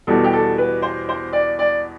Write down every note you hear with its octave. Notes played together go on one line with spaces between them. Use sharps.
E2 B2 G3 A4
G4
A4
B4
C5
C5
D5
D5